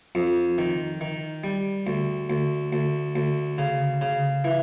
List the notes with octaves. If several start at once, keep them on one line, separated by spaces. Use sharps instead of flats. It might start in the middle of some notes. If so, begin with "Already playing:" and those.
F2
D#3
D#3
G3
D2
D2
D2
D2
C#3
C#3
E3